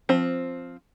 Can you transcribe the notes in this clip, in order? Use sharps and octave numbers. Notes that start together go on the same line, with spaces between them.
F3 C4